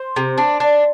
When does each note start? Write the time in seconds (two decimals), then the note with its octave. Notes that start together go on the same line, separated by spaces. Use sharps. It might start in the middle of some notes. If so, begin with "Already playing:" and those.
Already playing: C5
0.16 C3
0.38 D4
0.60 D4